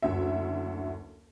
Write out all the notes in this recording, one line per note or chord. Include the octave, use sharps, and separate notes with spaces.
F#1 D2 E5